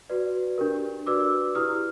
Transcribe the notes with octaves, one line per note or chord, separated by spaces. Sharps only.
F#4 B4 D5
D4 G4 A#4
F#4 B4 D5 D6 E6
E4 G4 B4 D#6 F6